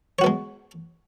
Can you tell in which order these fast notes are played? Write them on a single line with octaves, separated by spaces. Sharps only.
C#5 F#4 B3 G#3